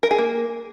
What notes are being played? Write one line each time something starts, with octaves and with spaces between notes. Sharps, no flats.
A#4
G#4
A#3